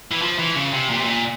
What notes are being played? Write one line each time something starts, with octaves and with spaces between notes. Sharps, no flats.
E3
F3
E3
C#3
C3
A#2
C3
A#2